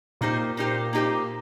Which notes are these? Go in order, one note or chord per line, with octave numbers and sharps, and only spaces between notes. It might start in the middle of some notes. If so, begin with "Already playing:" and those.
A#2 A#3 D#4 G4 C5
A#3 D#4 G4 C5
A#3 D#4 G4 C5